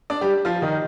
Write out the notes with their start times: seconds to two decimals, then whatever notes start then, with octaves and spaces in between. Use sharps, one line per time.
0.10 D4 D5
0.21 G3 G4
0.45 F3 F4
0.62 D#3 D#4